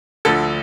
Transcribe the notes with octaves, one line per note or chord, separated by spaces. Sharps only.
D2 D3 F3 A4